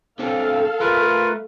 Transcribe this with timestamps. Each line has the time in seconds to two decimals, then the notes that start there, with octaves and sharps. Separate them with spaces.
0.19 D3 C4 A4 F5
0.80 A3 F4 A#4 B4